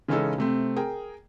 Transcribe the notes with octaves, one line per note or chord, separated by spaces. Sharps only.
C#3 E3 G#3 C#4 D#4 A4
C3 A3 C4
G#4 A#4 G5